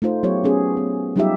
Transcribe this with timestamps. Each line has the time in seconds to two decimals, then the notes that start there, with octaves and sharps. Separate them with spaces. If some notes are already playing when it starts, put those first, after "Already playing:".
0.02 A3 D#4 F4 C5
0.23 F#3 B3 F4 G4 C#5
0.44 B3 C#4 G#4
0.77 B3
1.16 F#3 G3 D#4 F4 G4 E5